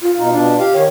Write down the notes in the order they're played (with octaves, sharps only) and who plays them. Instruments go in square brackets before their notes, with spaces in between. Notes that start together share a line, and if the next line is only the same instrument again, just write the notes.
[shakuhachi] F4
[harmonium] B2 D#4
B2 D4
G4 F5
[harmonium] D#3 [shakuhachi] C#5